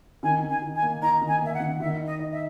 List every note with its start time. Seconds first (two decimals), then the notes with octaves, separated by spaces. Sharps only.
0.23 D#3 G#5
0.43 D#3
0.49 G#5
0.62 D#3
0.76 G#5
0.82 A#3
1.02 D#4 A#5
1.21 D#3
1.28 G#5
1.41 A#3 E5
1.54 F#5
1.60 D#3
1.80 D#3 E5
2.00 D#4
2.06 D#5
2.19 D#4
2.32 E5